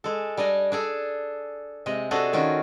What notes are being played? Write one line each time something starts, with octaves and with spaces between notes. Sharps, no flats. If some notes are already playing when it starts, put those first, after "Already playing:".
G#3 A4
G3 D4 D#5 G#5
D4 G#4 A4
C3 G#3 D#5
C3 D4 F#4 G#4 A4 D#5
D#3 C#4 F4 F#4